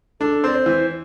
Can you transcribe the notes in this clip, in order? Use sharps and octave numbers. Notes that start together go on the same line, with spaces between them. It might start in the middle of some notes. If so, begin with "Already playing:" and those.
D4 A4
C4 D5
C5
E3